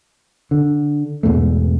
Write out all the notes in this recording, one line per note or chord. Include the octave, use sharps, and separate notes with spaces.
D3
E2 G#2 B2 A3